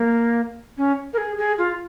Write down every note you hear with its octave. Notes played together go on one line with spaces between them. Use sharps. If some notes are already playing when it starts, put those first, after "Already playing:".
Already playing: A#3
C#4
A#4
G#4
G#4
F4